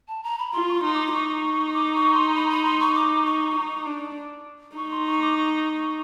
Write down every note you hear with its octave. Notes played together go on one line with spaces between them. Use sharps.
A5
A#5
B5
F4 C6
C#6
C6
D#4
D6
D#4 C#6
D6
C#6
C6
B5
B5
C6
C#6
D6
C#6
D#4
D4
D#4 C#6
C6
C#6
D6
C#6